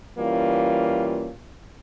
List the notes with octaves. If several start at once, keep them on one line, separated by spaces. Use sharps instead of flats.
E3 G3 A#3 C#4 F4